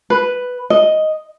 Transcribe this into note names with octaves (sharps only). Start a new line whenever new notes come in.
B4
D#5